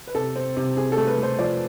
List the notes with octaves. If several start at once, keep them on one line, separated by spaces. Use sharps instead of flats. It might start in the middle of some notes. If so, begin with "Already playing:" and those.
B4
C3 A4
C4
C3
C3 G#4
A4
A3
B4
A3 C5
F3 D5